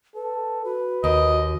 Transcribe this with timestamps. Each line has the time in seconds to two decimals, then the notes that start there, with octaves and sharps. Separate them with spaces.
0.15 A4 B4
0.65 F#4 B4
1.04 D#2 D#5